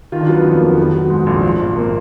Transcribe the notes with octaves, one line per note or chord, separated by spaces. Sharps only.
D#3 F4
D4
F#3 B3
F2 B3
F1 A#3
B3
D#3
F#3
G#2 G#3
A#1
F3
G#1
A#3